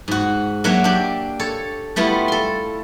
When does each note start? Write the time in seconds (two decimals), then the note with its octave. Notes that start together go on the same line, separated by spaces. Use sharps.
0.08 G#2 F#4
0.64 F#3 A#3 D4 F#4 C#5 E5
0.84 D4 G4
1.40 A4 C#5
1.96 G3 A3 B3 E4 F4
2.28 A4 C6